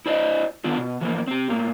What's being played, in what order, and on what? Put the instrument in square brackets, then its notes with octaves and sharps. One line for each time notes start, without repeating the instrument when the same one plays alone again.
[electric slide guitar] E4 C5 D5 D#5
D#3 B3 D4 F4
B2
E3 F3 A#3
C4 G4
A2 A#3